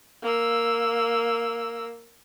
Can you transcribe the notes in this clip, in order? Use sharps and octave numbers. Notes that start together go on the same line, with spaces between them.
A#3 E6